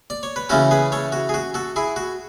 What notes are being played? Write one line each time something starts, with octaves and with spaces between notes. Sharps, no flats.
D5
C#5
B4
C#3 E3 A3 C#4 F#4 A4
G#4 B4
A4 C#5
F#4
G#4
F#4
F#4 A4
E4 G#4
F#4